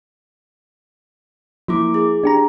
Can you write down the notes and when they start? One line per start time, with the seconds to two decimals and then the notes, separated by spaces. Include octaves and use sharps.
1.68 F3 A#3 E4 D6
1.94 G#4
2.24 D4 G4 A#5